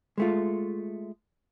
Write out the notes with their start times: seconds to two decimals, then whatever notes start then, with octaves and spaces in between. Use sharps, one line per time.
0.18 G#3 A3 F4